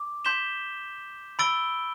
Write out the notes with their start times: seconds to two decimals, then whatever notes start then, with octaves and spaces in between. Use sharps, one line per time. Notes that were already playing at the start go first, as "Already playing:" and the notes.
Already playing: D6
0.25 C6 G6 B6 E7 G7
1.39 B5 E6 A6 D7 G7